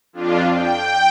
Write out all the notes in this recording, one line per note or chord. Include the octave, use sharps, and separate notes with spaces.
F2 D4 F4
G5